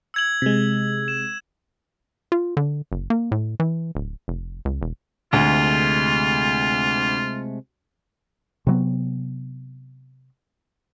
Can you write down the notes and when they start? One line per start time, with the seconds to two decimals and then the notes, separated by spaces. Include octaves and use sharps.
0.14 E6 G#6 F#7
0.42 C3 G#3
1.08 E7
2.32 F4
2.57 D3
2.92 F#1
3.10 A#3
3.32 A2
3.60 E3
3.95 D1
4.28 F1
4.65 C#2
4.81 E1
5.33 D2 C3 G#3 A3 F4
8.67 C3 F#3 B3